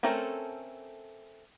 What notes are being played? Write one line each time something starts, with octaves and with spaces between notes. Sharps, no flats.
A3 C4 C#4 A4 A#4